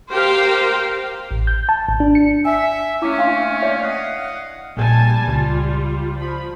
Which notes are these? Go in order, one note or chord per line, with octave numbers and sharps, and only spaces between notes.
G4 A#4 C5 F5 G5
A1
G6
A5
G#1
D4
C#7
E5 G#5
A3 A#3 C#4 E4 D6
D4 F5 C6
C#5 D5 E5
D#5 F5 F#5
A#1 A#2 G3 G#5 A5
C#2 G3 F4
F3 B5